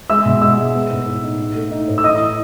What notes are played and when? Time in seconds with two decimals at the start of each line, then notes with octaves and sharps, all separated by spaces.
0.10 G#3 E5 E6
0.25 B2
0.41 G#3 E5 E6
0.58 G#3
0.75 B3
0.91 A2
1.06 A2
1.23 D#4
1.39 D#4
1.55 A3
1.71 D#4
1.88 A2
1.98 E6
2.04 E3 D#5 D#6
2.20 E3